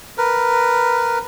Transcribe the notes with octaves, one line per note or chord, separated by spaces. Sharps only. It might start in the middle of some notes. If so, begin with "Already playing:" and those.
A#4 B4